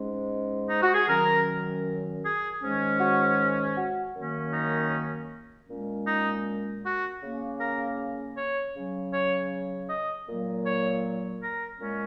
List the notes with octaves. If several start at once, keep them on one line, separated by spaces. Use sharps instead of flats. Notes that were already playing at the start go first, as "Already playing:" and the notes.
Already playing: G#2 G#3 C#4
D#4
F#4
G#4
F#2 D#3 F#3 C#4 A#4
G#4
G#2 D#3 G#3 C#4
F#4
F#4
F#2 D#3 A#3 C#4
D#4
A#2 G#3 C#4
D#4
F#4
C#3 A#3 C#4
A#4
C#5
C#3 F#3 C#4
C#5
D#5
A#2 F#3 A#3
C#5
A#4
A#2 G#3 C#4